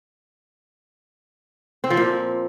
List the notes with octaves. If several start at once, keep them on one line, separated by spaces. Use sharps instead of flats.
C4
F3
A#2